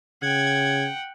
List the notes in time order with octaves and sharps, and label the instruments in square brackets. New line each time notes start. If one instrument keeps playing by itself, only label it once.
[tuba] C#3 [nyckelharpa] F#5 G5 [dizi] G#6